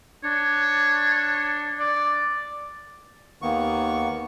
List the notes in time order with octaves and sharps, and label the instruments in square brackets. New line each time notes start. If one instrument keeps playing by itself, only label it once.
[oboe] D4 [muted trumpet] C#5
[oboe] D5
[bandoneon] D#2 D#3 A#3 B3 C#6